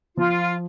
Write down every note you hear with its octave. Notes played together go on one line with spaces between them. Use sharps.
F3 F4